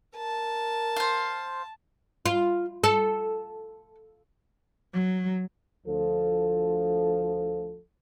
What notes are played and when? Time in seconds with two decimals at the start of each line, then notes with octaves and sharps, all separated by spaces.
0.16 A#4 A5
0.96 C5 F5
2.26 F4
2.84 A4
4.94 F#3
5.87 D2 F3 A4